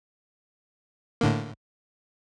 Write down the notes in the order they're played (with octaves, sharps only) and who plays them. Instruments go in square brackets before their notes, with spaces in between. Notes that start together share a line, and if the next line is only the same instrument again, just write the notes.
[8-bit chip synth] A2 D3 A#3